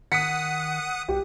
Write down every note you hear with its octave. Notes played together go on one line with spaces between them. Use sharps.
D#3 F#5 D#6 B6 C#7
C2 G4